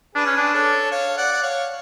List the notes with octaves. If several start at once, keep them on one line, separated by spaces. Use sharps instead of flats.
D4 G#4 B4
C#4
D4
A4 C#5
C#5 F5
D5 F#5
F#5
C#5 F5